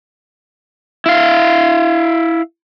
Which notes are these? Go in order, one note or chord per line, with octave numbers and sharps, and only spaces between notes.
E4 F5